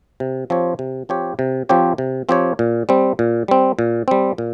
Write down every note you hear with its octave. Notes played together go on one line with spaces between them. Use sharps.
C3
F3 C4 G4 C#5
C3
F3 C4 G4 C#5
C3
F3 C4 G4 C#5
C3
F3 C4 G4 C#5
A#2
G3 C4
A#2
G3 C4
A#2
G3 C4
A#2